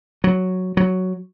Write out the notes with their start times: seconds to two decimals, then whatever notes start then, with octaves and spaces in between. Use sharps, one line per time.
0.24 F#3
0.77 F#3